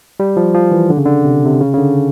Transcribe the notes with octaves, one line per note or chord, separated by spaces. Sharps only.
G3
F3
F3
E3
D3
C#3
D3
C3
C3
C#3
C#3
D3